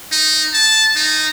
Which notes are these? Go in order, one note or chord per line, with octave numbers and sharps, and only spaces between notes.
D#4
A5
D#4